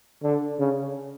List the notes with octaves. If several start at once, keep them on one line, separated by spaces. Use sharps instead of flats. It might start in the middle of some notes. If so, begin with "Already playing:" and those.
D3
C#3